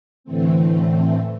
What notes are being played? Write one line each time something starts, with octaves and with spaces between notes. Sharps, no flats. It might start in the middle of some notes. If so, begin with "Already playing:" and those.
A2 D3 E3 A3 C4